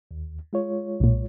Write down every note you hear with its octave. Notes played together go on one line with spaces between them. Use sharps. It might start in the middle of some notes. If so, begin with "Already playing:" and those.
D#2
G#3 F4 C#5
B1 A#2